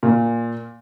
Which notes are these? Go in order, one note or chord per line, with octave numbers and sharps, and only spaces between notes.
A#2